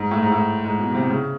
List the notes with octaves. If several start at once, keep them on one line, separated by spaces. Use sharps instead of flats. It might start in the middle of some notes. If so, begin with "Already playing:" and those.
Already playing: G#2
A2
G#2
A2
G#2
B2
B2
C3
C#3